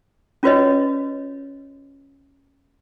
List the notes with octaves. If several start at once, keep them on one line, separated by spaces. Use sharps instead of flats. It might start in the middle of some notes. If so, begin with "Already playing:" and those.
C#4 F4 F#4 B4 C#5 D#5